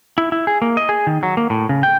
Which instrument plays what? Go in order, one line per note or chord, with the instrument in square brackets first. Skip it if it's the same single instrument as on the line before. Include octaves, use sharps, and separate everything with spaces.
[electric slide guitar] E4
E4
G#4
A#3
D#5
G#4
D#3
F#3
A#3
A2
C#3
G5